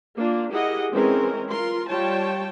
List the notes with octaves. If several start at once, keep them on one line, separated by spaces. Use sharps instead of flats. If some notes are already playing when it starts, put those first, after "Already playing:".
A#3 D4 F4
E4 G4 G#4 A#4 D#5 F#5
E3 G#3 C4 C#4 A#4
F4 A#4 C6
G3 F4 C#5 G5 A5